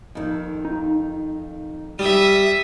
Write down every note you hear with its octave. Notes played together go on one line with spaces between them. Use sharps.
F2 D#3
D#4
G3 E5 D#6